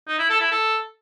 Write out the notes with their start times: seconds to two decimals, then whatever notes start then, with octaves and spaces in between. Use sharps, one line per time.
0.08 D#4
0.19 E4
0.30 A4
0.41 E4
0.51 A4